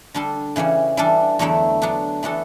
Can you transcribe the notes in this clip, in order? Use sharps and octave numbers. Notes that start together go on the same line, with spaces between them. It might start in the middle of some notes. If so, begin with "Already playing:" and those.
D3 G3 D4 A4
C#3 E3 G3 C#4
E3 G3 D4 A4
E2 D3 F#3 A3 E4
F#3 B3 D4
E3 B3 D4 F#4 A4